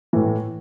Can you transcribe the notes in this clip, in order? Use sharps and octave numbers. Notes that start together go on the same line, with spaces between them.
A2 E3